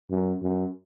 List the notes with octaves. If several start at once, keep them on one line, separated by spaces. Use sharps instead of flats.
F#2
F#2